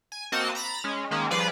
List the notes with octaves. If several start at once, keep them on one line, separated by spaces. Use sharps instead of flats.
G#5
A#3 C4 F#4 D#5 A5
A#5 B5 A6 A#6
G#3 C#4
D#3 G#3 A#3 C#4
F3 G3 F4 G#4 B4 D5